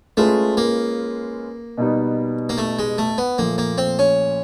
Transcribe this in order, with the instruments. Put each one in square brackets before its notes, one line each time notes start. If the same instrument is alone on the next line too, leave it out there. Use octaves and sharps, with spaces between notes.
[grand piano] G#3 C#4 F4 G#4 B4 [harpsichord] A3
[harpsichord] A#3
[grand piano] B2 G3 B3 D#4
[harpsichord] A#3
A3
G#3
A3
B3
[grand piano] A#2 F3 A3 [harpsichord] A#3
[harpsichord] A#3
C4
C#4